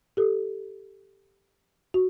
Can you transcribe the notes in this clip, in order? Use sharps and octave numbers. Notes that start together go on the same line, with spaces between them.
G4 A4
F#4